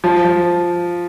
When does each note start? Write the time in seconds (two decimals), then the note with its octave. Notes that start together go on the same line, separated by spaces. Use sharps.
0.04 F3
0.25 F3